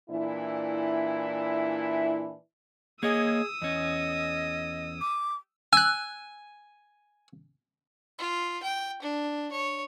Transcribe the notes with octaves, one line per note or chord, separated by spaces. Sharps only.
A#2 E3 D4 E4
A#3 G#4 C#5 D#5 D#6 E6
E2 C#4 D#5
D6
G#5 E6 F#6
F4
G5
D4
C#5